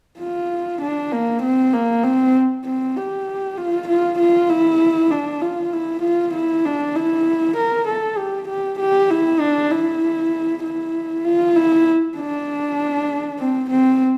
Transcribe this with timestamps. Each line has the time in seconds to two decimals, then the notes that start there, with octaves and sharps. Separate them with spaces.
0.19 F4
0.81 D4
1.12 A#3
1.42 C4
1.73 A#3
2.04 C4
2.65 C4
2.96 G4
3.57 F4
3.88 F4
4.19 F4
4.49 E4
5.11 D4
5.41 F4
5.72 E4
6.02 F4
6.34 E4
6.65 D4
6.96 E4
7.56 A#4
7.88 A4
8.17 G4
8.49 G4
8.79 G4
9.10 E4
9.40 D4
9.71 E4
10.64 E4
11.24 F4
11.56 E4
12.16 D4
13.39 C4
13.70 C4